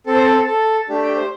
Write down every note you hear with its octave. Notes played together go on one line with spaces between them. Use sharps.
C4 A4
C5
A4
A4
A3 D4 G4
G5
C5